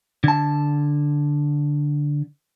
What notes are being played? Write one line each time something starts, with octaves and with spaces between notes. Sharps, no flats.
D3 A5